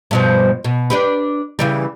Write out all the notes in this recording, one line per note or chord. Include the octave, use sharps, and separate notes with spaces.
G2 B2 F3
B2
D4 G4 B4
C#3 E3 G3